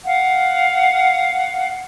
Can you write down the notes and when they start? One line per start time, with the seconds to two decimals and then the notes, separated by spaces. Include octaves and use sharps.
0.05 F5 F#5